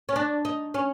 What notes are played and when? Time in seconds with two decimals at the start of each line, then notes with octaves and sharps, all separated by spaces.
0.09 C#4
0.16 D4
0.45 D#4
0.74 C#4